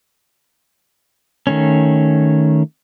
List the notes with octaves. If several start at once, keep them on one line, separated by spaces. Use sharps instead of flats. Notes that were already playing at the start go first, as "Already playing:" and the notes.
D#3 A3 C#4